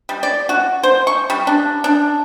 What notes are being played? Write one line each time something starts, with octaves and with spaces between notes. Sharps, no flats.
G3
D5
F#4
C5
C#6
G3
D4
D4